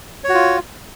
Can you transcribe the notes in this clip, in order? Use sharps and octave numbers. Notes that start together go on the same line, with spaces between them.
F4 F#4 C#5